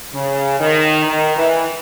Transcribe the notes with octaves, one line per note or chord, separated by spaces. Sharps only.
C#3
D#3
D#3
E3